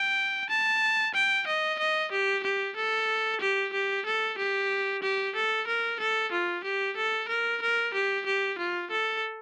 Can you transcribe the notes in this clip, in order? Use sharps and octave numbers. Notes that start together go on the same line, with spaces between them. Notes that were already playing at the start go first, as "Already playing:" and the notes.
Already playing: G5
A5
G5
D#5
D#5
G4
G4
A4
G4
G4
A4
G4
G4
A4
A#4
A4
F4
G4
A4
A#4
A#4
G4
G4
F4
A4